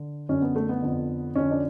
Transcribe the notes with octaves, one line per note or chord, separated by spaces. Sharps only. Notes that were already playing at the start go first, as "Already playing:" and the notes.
Already playing: D3
F#2 D3 C#4
B3
A3
B3
F2 D3
F2 D3 C#4
D4